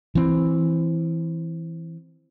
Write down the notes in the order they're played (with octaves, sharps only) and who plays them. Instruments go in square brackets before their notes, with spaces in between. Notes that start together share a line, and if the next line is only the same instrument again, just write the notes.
[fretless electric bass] E3 C4